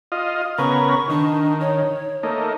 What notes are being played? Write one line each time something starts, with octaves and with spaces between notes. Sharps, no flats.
F4 D#5
C#3 B3 A#4 C#6
D#3 D4
C#5
A3 A#3 D#4